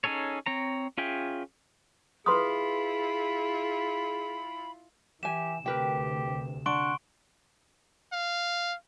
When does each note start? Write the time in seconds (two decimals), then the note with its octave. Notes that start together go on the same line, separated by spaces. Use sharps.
0.04 C#4 D#4 G#4 A4 C#5
0.46 C4 C#5 A#5
0.98 C#4 F4 G#4 E5 G5
2.26 E4 F4 G#4 B4 B5 C6 D#6
5.23 E3 G4 E5 G#5 E7
5.66 D2 C3 G4 A#4 B4 G5
6.66 D4 F#5 C6 C#6 D7
8.13 F5